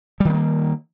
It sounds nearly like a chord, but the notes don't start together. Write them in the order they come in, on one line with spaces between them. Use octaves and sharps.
G3 D#3 B3 A#3